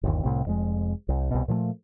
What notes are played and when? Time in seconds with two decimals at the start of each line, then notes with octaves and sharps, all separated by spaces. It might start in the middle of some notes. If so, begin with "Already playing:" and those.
0.03 G1 D#2
0.23 C2 A2 C3
0.45 F1 F2 G#3
1.09 C2
1.31 C2 B2
1.48 A#2 F3 G#3 A3